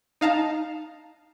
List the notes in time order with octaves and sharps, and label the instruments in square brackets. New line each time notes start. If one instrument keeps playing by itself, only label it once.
[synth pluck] D#4 F5 A5 A#5